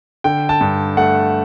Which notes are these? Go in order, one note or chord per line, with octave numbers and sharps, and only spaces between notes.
D3 G5
A5
G2
A3 F#5